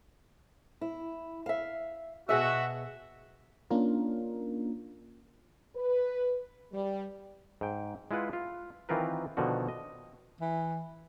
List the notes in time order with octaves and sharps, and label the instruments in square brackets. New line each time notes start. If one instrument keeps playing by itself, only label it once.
[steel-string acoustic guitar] E4
E5 F5
[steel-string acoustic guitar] B2 G#4 D#5 [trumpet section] F#4 E5
[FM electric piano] A#3 C#4 D4 F4 A#4
[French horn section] B4
G3
[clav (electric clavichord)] G#2 G5
G#3 E4 F4 B4 F#5
F4
D#3 E3 C4 F4 A#4 B4
B2 D3 D#3 F3 F#4
D#5
[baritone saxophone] E3